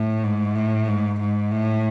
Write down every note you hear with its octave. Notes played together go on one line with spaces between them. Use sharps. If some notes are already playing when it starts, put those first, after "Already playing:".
Already playing: A2
G#2
A2
G#2
G#2
A2